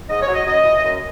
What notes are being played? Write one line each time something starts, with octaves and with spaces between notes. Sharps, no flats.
G#2 D#5
C#5
F#3
D#5
F#2 D#5
E3
F#2